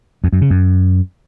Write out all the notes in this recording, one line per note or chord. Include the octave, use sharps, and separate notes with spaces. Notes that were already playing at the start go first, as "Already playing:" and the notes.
F2
F#2
C#3
F#2